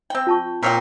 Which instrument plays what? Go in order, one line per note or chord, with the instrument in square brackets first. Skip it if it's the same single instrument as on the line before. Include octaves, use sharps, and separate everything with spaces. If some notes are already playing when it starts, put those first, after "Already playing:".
[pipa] C4 G5
[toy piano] F4 A5 C#6
[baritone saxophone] A#2 [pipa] C4 C#5 G5